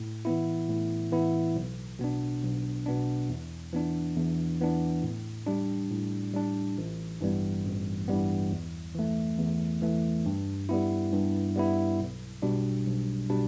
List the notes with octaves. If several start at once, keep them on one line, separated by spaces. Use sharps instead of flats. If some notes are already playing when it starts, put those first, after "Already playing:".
Already playing: A2
E3 B3 E4
A2
E3 B3 E4
B1
B2 B3 D4
B1
B2 B3 D4
E2
E3 B3 D4
E2
E3 B3 D4
A2
G3 D4
A2
G3 D4
A1
G2 E3 G3 B3
A1
G2 E3 G3 B3
E2
E3 A3
E2
E3 A3
G2
G3 B3 E4
G2
G3 B3 E4
B1
B2 G3 D4
B1
B2 G3 D4